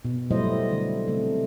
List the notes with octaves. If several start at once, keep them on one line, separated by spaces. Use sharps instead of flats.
B2
F#3 G3 A3 E4 C5 D#5
D3
C3 A3